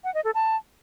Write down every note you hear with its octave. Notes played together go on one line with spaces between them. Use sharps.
F#5
D#5
A4
A5